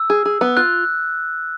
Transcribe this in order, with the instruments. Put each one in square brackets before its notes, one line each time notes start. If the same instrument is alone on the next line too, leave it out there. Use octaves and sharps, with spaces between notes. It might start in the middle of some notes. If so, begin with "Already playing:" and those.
Already playing: [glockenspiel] E6
[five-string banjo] G#4
G#4
B3
[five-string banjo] F4 [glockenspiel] F#6